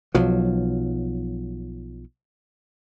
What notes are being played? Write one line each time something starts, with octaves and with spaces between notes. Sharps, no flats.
B1 F3 F#3